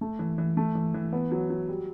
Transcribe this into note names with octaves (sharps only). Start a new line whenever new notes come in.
A3
E3
E3
A3
E3
E3
B3
F#3
F#3
G3